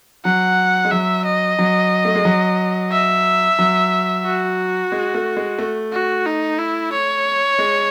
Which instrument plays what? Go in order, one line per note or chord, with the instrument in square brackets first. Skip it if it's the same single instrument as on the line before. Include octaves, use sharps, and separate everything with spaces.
[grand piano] F#3 [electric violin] F#5
[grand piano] G#3
[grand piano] F#3 [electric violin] E5
[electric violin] D#5
[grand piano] F#3
A3
G#3
F#3
[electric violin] E5
[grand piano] F#3
[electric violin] F#4
[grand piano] G#3
A3
G#3
A3
[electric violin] F#4
D#4
E4
C#5
[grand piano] G#3